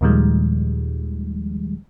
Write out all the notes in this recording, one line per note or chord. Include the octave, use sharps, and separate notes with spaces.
D#2 A#2 D#3 F3 G3 G#3